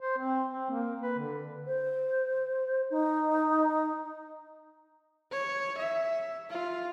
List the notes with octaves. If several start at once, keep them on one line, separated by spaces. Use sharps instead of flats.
C5
C4
C4
A#3
B4
D3
C5
D#4
C#5
E5
F4